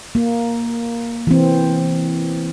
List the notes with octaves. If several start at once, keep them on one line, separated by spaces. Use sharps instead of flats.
A#3
E3 C4